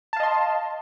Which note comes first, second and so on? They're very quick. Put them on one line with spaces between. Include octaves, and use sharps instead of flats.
A5 F5 D#5 C6